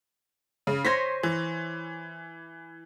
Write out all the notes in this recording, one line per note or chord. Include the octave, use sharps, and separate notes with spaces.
C#3
C5 C#5 G#5 C6 A#6 B6
E3